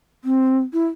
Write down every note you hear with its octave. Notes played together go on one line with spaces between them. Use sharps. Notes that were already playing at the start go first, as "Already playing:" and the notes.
C4
E4